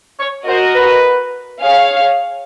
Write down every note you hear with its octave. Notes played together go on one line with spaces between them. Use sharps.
C#5
F#4 A#4 C5 D#5
B4
G#4 C#5 F5